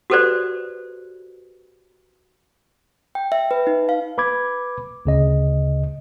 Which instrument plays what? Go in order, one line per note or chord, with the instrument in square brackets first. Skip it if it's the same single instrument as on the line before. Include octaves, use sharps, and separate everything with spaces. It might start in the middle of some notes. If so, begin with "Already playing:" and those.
[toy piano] F#4 G4 A4 B4 C5 D5
[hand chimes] G5
E5
B4
D#4
F5
[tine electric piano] B4 B5 D6 G#6
D2 C#3 D#5